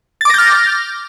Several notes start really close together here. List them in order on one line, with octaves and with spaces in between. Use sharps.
A6 D6 A#6 G6 F6